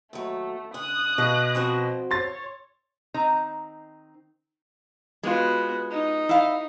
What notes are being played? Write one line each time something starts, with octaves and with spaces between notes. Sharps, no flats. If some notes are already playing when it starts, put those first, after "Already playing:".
D#2 F#3 A3
D3 D#6 F#6
B2 F5
F3 C4 F#4
C#5 C6 A6
D#3 C4 D#4 A#5
G#3 B3 F4 F#4
D#4
E4 F5